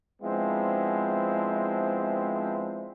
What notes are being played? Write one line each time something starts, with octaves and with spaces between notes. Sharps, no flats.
F3 G#3 B3 C4 D4 E4